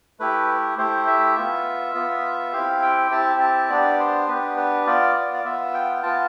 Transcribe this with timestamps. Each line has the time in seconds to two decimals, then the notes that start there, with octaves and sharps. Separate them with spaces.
0.20 A3 E4 G4 B4
0.78 A3 E4 G4 C5
1.07 E5
1.37 B3 F4
1.94 B3 F4
2.53 C4 E4 G4 F5
2.82 G5
3.11 C4 E4 G4 A5
3.40 A5
3.70 B3 D4 G4 D5
3.99 C5
4.27 B3 D4 G4 B4
4.57 B4
4.87 B3 F4 D5
5.16 D5
5.34 D5
5.45 B3 F4 E5
5.74 G5
6.03 B3 F4 A5